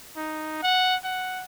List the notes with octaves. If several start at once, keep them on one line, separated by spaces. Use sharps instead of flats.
D#4
F#5
F#5